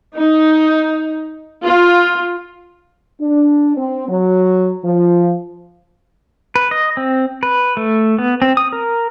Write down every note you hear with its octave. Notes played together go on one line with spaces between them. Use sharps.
D#4
F4
D4
C4
F#3
F3
B4
D#5
C4
B4
A3
B3
C4
D#6
A#4